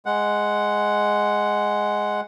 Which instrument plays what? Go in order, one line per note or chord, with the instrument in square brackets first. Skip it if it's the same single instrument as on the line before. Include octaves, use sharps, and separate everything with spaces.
[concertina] G#3 F#5